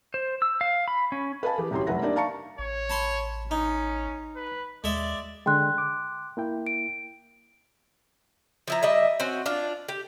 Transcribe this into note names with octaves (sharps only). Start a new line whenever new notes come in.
C5
E6
F5
B5
C#4
B4 D#5 F5 G#5 A5
E3 G4 G#4 B4
D#1 C2 C3 C#4 F#4 C6
F1 F#2 B4 E5 F#5 A#6
G3 A#3 D4 D#4 D5 E5
F5 A5 A#5 C#6 C#7
A1 C#5
A5 B5 C6
C#4 D#4
B4
D#2 G#3 D5 E5
D3 G#3 G5 C6 F#6
D6
A#3 E4 G5
D7
F3 E4 A#5
G3 D#5 E5
C4 C#4 F#4
D4 F4
G4